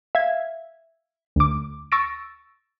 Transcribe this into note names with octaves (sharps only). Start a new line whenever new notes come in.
E5 F5 G#6
D2 D6
C#6 E6 A6 A#6 D7